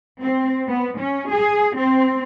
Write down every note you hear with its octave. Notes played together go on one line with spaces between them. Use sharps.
C4
B3
C#4
G#4
C4